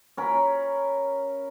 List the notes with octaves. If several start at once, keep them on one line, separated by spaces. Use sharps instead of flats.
C#4 A#4 B5